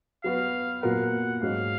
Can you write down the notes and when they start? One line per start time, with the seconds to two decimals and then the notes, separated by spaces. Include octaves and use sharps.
0.24 F#3 B3 F#4 B4 F5
0.83 A#2 F#3 B3 F4 A#4 F#5
1.42 G#2 F#3 C#4 F5